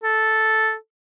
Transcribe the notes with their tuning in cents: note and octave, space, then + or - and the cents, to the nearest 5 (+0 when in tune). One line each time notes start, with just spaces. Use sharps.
A4 -5